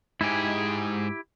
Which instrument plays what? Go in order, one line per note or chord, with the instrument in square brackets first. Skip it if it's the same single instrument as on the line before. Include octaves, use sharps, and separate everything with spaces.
[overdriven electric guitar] G#2 G#4 [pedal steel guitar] E4 G4